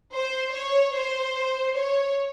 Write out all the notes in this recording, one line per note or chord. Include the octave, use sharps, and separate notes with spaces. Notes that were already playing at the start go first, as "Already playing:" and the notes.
C5
C#5
C5
C#5